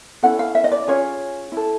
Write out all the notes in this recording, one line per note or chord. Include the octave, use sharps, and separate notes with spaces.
C#4 E4 A4 F#5
F5
E5
D#5
D5
C#4 F4 G#4 C#5
E4 A4